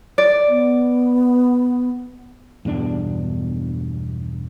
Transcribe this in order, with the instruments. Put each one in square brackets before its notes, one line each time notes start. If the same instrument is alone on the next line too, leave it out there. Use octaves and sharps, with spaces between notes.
[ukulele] D5
[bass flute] B3
[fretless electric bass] E2 G2 B2 D4